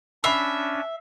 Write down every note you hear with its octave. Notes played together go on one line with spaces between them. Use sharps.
C#4 D4 E5 B5 C7 F7